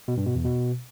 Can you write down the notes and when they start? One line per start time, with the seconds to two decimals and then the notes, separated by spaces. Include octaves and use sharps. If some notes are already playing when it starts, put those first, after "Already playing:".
0.08 B2
0.17 G2
0.26 B2
0.35 E2
0.45 B2